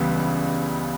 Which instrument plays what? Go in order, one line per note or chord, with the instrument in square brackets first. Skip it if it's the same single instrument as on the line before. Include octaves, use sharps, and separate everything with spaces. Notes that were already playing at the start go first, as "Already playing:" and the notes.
Already playing: [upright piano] C#2 C#3 E3 G3 B3